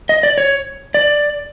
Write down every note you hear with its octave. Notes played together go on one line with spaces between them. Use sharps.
D#5
D5
C#5
D5